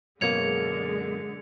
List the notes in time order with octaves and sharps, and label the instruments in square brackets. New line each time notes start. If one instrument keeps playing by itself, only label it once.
[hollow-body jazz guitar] F#2 B2 A#3 [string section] D3 G#3 [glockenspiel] G#6 C#7 F7